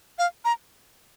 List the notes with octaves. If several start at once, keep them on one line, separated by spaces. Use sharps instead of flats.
F5
A#5